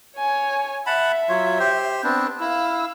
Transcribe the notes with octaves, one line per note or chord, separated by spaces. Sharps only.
C#5 G#5
E5 F#5 A5 B5
F#3 F4 C#5
G4 C5
B3 C4 D4
E4 F5 E6